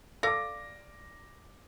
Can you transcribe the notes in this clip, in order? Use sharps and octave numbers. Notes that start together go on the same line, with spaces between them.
A4 D5 F5 D6 A#6